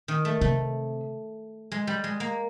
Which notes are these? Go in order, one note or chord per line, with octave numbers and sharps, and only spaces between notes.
D#3
A3
C3 A3
G#3
G3
G#3
A#3